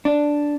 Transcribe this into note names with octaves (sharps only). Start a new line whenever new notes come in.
D4